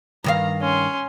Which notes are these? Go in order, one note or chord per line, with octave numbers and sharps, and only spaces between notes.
G2 D#3 F5 A#5
C#4 C6